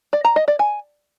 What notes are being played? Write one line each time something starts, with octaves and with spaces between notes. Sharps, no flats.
D5
A#5
D#5
D5
G#5